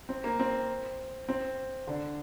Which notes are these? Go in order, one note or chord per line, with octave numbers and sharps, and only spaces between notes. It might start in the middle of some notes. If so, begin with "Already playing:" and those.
C4
A#3
C4
C4
D3 D4